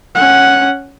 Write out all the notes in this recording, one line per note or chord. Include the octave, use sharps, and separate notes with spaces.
C#4 F#5